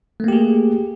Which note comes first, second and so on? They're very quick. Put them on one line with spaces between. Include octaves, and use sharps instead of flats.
A3 A#3 G4 G#4